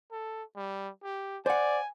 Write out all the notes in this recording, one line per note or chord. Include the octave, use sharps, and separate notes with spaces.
A4
G3
G4
C5 D5 F#5 G#5